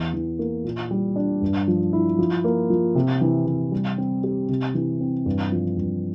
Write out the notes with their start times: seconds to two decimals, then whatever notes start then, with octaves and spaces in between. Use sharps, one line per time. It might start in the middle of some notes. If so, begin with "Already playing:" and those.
Already playing: E2
0.14 E3
0.39 A#3
0.64 A#2
0.91 G3
1.16 D4
1.42 G2
1.68 F3
1.93 E4
2.19 F3
2.44 A#3
2.70 F3
2.95 C3
3.21 E3
3.47 C3
3.72 G3
3.98 C4
4.24 G4
4.49 C3
4.74 E3
5.01 C4
5.26 G2
5.52 F3
5.77 G2